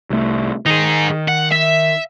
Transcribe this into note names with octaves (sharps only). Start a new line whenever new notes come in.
C2 A3
D#3 D#4 G#4
F#5
E5